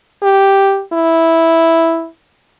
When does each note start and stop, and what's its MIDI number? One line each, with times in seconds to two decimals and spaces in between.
0.22 0.82 67
0.93 2.07 64